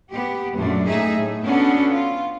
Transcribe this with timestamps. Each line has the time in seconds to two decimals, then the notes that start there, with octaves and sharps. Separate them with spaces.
0.12 B3 G4
0.55 F#2 A#2 A3 D4
0.87 A2 D#4 G#4 E5
1.16 A2
1.46 B3 C#4 D4 F#4 A4
1.90 F4